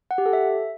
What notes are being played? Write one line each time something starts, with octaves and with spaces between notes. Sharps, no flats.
F#5
G4
A4
E5